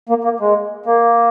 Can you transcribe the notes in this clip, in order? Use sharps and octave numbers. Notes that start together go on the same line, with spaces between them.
A#3
A#3
G#3
A#3